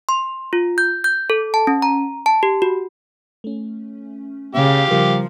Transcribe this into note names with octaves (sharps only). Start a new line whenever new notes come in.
C6
F4
G6
G6
A4
A5
C#4
A#5
A5
G4
F#4
A3 C#4
C#3 G4 F5
C#3 F3 G3 A#4